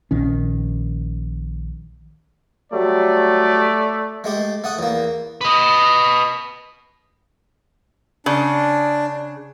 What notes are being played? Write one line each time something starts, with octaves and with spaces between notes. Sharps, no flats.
A#1 D#3 C#4
F#3 G3 A3 D5
G#3 A3 G4
A3 F#5 D#6
E2 A#3
B4 D#5
C#3 D4